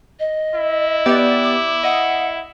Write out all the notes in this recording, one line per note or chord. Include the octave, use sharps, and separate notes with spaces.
D#5
E4
B3 G4 D5
D6
D#5 F#5